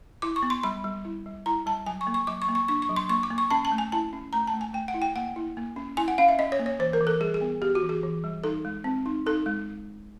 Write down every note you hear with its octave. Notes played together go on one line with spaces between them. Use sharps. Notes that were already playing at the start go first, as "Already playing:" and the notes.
E4 D6
C#6
B3
C6
G3 B5
G3
E4
G3
E4 A#5
G3 A5
F#3 G#5
C#6
A#3
C#6
F#3 D6
C#6
A#3
C#6
D4 C#6
C#6
F#3
C6
A#3 C#6
D6
A#3
C#6
C#4 A5
A5
A3
G#5
E4 A5
C#4
A3 A#5
A5
A3
G#5
A3 G5
F#5
E4
G5
A#3 F#5
E4
A#3
C#4
E4 G#5
F#5
C#4 F5
E5
C#4 D#5
C#5
A#3
C#5
E3 C5
A#4
E3
A4
G3 G#4
G#4
B3
B3 G4
F#4
E3
G#4
E3
G3
D#4 A4
G#3
C4
D#4
D#4 A4
G#3